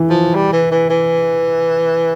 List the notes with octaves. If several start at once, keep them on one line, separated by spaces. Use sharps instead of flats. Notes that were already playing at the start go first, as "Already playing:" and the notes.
Already playing: E3
F3
G3
E3
E3
E3